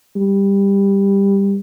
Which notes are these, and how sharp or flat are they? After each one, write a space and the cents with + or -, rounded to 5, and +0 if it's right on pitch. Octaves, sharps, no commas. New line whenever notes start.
G3 +15